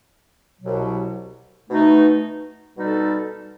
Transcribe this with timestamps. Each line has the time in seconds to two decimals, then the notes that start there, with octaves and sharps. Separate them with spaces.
0.61 C2 B2 F#3
1.69 B2 A3 D#4
2.78 B2 G3 D#4 A4